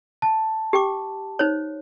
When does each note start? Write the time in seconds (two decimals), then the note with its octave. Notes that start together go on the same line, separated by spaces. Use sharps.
0.22 A5
0.73 G4 G5 D6
1.39 D#4 C5 C#5